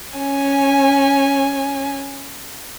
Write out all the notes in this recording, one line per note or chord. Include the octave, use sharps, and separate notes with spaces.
C#4 G#5